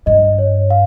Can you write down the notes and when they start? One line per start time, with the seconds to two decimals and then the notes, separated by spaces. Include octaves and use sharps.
0.06 G2 D#5
0.39 C#5
0.70 F5